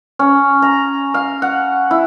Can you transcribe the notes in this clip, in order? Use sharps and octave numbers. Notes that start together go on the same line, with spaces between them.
C#4
A#5
F5
F#5
E4